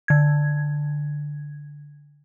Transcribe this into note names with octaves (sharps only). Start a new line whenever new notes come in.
D3 G#6